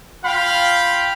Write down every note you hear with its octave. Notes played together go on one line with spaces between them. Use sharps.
F4 F5 G5 B5